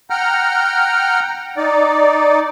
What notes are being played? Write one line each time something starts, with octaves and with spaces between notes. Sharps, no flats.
F#5 G5 A#5 F6
D#4 D5